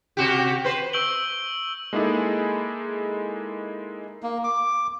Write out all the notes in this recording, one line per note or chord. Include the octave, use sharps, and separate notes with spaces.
C3 F#4 G4
B4 C5
C#6 E6 G6 D7 F#7 G7
G#3 A#3 D#4 E4 G#4 A4
A#3
D6